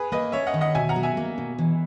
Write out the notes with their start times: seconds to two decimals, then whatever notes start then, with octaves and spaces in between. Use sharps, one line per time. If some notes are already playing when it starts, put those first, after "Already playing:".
Already playing: G#4 B4
0.12 A#3 B4 D#5
0.32 C#4 C#5 E5
0.47 D#5 F#5
0.54 D#3
0.61 D#5 F#5
0.75 B2 E5 G#5
0.89 F#5 A#5
0.96 F#3
1.03 E5 G#5
1.17 A#3
1.38 B2
1.59 E3